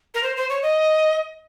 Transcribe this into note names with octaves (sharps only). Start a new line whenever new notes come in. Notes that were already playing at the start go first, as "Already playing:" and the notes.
A#4
C5
C5
C#5
D#5